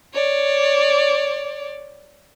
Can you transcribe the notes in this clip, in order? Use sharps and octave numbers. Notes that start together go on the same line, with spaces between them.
C#5 D5